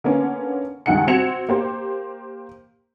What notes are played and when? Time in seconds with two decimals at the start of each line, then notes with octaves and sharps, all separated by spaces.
0.04 D3 A#3 B3 C#4
0.86 C#2 G2 D#3 F#5 G#5 C#7
1.07 C4 F#4 G#6 C#7 E7 F7
1.49 A#3 G4 C5